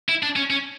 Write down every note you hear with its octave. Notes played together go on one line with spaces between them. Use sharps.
E4
D4
C#4
C#4